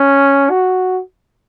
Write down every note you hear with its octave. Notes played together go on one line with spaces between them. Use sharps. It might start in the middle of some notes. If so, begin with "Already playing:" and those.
Already playing: C#4
F#4